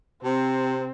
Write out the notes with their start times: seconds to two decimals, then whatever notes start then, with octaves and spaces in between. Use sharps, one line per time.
0.24 C3 C4